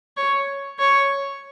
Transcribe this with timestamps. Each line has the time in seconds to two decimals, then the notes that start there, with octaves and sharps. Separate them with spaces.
0.17 C#5
0.79 C#5